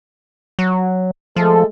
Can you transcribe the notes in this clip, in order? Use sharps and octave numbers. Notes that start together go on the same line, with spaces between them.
F#3
F3 G#3 A3 A4